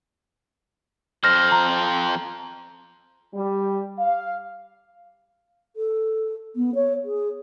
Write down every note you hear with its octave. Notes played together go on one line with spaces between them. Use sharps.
F2 C5 F6 A#6
A#5
G3
F5
A4
B3
C#5
G#4